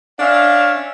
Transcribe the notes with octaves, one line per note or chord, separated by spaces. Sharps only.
C#4 D4 E5 F5